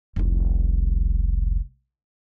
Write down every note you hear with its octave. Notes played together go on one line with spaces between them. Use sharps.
F1 C2